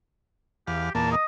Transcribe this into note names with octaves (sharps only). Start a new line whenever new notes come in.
E2 G4 F5
E2 A#2 A#3 A5
D#5